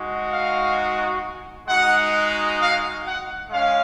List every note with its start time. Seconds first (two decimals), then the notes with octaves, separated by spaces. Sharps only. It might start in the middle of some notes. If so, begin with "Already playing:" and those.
Already playing: G#3 D#4 F#4
0.32 F5
1.68 G#3 D#4 F#4 F#5
2.59 F5
3.05 F#5
3.50 G#3 C#4 F5